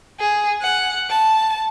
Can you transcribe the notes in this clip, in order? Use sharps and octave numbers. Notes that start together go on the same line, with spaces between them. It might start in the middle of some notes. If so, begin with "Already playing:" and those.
G#4
F#5
A5